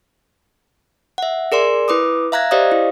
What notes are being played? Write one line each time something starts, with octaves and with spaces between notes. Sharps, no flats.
E5 F#5
G#4 A#4 D5 C6
E4 B4 D6 D#6
E5 F5 A#5 F#6 G#6 A#6
G4 C5 D5 D#5 F5 D#6
E4